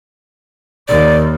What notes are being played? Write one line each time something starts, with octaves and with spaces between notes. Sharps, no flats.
D#2 D5